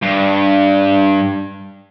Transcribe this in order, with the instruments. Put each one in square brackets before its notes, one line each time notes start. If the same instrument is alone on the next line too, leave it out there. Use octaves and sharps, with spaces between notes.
[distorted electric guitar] G2